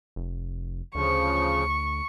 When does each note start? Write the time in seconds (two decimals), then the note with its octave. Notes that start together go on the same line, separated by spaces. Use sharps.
0.16 F1
0.95 D2 C#3 F3 C#6